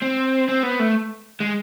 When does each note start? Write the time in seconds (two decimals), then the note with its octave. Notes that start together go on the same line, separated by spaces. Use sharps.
0.02 C4
0.48 C4
0.63 B3
0.79 A3
1.40 G#3